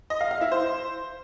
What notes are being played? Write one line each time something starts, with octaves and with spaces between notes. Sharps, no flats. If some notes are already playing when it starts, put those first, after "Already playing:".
D#5
F5
F5
E4
C5